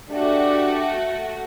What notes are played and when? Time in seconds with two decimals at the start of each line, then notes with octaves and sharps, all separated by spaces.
0.10 A3 D4 F#4 G4